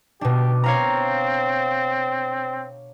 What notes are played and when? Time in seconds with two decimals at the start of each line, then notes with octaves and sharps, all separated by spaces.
0.21 B2 D4 G4
0.64 C4 C#5 F5 A#5